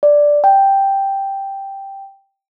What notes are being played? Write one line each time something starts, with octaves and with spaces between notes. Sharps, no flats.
D5
G5